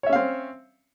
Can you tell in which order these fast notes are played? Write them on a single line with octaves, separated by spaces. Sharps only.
C#5 E5 C#4 F5 C4